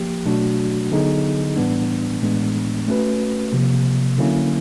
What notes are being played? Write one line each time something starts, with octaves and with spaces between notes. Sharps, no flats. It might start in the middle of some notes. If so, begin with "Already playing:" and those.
Already playing: F3 A#3 G4
B2 F#3 A3 D4 F#4
D3 F#3 B3 D#4 G#4
A2 E3 G3 B3 D4
A2 E3 G#3 B3 D4
A3 C#4 F#4 B4
C3 F3 A#3
D3 F#3 A#3 C#4 E4